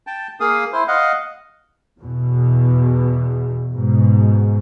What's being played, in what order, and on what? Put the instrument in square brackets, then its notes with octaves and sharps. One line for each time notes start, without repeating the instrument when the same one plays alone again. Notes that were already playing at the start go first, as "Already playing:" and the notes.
[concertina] G5 A5
A#3 G#4 F5 D#6
E4 C5
D#5 F5 F#5
[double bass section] E2 B2
G#2 B2